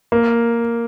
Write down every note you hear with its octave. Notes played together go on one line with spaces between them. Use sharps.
A#3